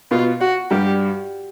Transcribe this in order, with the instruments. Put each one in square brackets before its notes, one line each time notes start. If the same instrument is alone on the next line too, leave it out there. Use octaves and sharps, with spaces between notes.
[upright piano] B2 B3 [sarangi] F4
[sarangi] F#4
[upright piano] G2 G3 [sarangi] G4